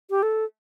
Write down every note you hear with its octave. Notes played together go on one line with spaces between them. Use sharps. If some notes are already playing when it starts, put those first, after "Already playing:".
G4
A4